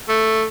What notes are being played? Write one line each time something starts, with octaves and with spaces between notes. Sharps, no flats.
A3